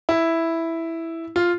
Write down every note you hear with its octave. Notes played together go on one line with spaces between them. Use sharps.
E4
F4